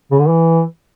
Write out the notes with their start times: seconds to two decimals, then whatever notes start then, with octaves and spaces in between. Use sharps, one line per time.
0.12 C#3
0.20 D3
0.29 E3